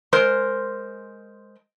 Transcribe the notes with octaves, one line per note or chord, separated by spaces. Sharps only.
G#3 A#4 C5